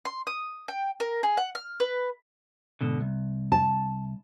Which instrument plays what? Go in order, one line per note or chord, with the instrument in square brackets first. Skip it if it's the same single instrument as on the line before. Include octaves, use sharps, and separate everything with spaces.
[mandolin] C6
D#6
G5
A#4
G#4
F#5
F6
B4
[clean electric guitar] G#2 B2 D3
C2
[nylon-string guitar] A5